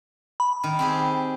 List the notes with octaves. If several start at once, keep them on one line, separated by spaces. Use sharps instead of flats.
B5
D#3
C4 G4 G#4